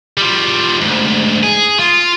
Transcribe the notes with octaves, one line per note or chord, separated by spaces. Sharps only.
F3 G3
D2 G#2
G#4
F4